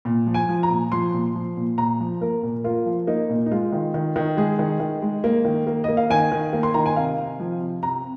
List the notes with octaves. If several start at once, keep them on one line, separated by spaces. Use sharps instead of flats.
A#2
F3
G#5
F3
A#5
A#2
F3 C6
A#2
F3
A#2
A#2 A#5
F3
A#3 A#4
A#2
A#3 F4
F3
A#3 D#4
A#2
D#4
G#3 F4
D#3
D#3
D#3
G#3 G#4
D#3
D#3
G#3
A#3
D#3
A#3
A#3 D#5
F5
D#3 G#5
D#3
A#3
C6
D#3 A#5
G#5
C3 F5
C3
F3
C3
C3 A#5